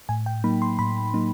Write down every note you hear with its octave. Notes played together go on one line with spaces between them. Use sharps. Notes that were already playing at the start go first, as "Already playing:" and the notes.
A2 G#5
G5
F#3 A#3 D#4 B5
C6
A2 B5
F#3 A#3 D#4